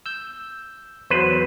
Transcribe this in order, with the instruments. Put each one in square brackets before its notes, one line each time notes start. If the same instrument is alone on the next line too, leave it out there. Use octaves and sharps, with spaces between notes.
[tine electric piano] E6 G6
[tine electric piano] E2 F#3 [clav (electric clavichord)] B4 C5